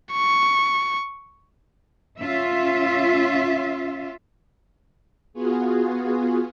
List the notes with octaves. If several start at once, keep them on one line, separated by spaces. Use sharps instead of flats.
C#6
C#4 F4 E5
B3 F4 F#4 G#4